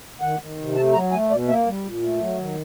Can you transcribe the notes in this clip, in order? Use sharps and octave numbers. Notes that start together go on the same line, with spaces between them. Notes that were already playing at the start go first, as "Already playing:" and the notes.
D#3 F#5
D#3
C3
A3 A5
F#3 A#5
A3 G#5
B2 D5
A#3 E5
G3
A#2
A3
F#3
D#3